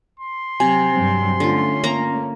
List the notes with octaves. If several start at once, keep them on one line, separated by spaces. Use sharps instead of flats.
C6
C3 F#3 G#5
G2 F#3 C4
D3 A3 C#4 F4
A#3 A#5